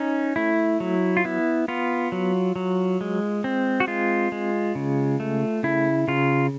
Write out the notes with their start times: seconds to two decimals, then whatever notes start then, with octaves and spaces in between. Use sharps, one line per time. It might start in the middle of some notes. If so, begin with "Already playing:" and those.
Already playing: C#4 D#4
0.36 A3 E4
0.80 F#3
1.17 F4
1.24 B3 E4
1.68 B3 F4
2.12 F#3
2.56 F#3
3.01 G#3
3.44 C4
3.80 F#4
3.87 G#3 F4
4.32 G#3
4.75 C#3
5.20 A3
5.63 C#3 E4
6.08 C#3 F4